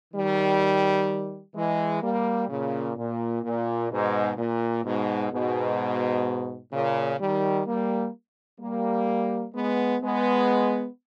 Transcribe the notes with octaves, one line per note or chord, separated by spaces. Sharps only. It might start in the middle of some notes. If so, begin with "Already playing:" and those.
D#3 G3
E3 G#3
G3 A#3
A#2 C#3
A#2
A#2
G#2 B2
A#2
G#2 B2
G#2 B2
A#2 C#3
D#3 G3
G3 A#3
G3 A#3
G#3 B3
G#3 B3